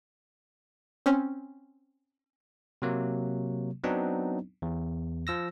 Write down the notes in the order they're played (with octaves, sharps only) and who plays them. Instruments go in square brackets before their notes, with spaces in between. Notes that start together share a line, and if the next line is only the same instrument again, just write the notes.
[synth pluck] C4 C#4
[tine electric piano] C3 F#3 A#3
F#3 B3 C4 D4 D#4
E2
F3 E6 A#6